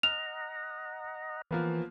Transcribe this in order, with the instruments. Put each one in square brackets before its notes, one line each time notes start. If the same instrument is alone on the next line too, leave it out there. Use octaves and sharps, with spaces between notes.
[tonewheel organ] D#5 F#5 A#5 [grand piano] F6 [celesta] F7
[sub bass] E3 [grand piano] F3 A#3 B3